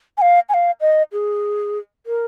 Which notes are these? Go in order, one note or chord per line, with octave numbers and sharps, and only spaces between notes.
G#5
F5
G#5
F5
D#5
G#4
A#4